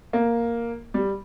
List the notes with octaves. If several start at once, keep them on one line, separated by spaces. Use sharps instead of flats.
A#3
G3